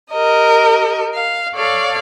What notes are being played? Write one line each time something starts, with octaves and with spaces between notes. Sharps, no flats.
G4 A#4 D#5
F5
A4 C#5 D5 F5